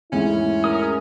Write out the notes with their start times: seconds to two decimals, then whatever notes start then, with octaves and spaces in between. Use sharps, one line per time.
0.12 E2 G#2 A3 C#4 E4
0.64 A#4 D#6